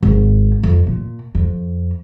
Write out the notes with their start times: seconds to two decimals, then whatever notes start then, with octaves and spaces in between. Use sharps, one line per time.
0.03 G#1
0.63 F2
0.87 A#2
1.35 F2